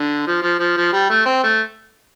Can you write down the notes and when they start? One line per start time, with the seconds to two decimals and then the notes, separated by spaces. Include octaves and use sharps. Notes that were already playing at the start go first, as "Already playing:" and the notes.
Already playing: D3
0.27 F3
0.42 F3
0.59 F3
0.77 F3
0.92 G3
1.10 A3
1.25 C4
1.43 A3